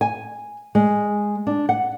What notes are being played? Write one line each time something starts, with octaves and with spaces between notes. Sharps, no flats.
G#5
G#3
D4
F#5